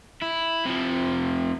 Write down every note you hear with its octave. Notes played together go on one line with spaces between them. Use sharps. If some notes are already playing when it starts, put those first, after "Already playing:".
E4
C3 F3